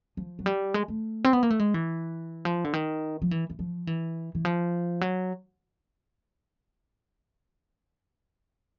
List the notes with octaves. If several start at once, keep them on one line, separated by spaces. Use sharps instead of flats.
F3
F#3
G3
G#3
A3
C4
B3
A#3
A3
G#3
E3
F3
D3
D#3
F3
E3
E3
F3
E3
E3
F3
F#3